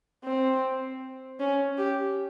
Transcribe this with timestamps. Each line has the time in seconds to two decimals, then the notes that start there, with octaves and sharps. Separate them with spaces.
0.24 C4
1.40 C#4
1.78 G4